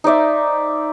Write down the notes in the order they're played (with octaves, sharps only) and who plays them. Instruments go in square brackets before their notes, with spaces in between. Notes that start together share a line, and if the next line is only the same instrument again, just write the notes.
[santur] D#4 C5 D5 E5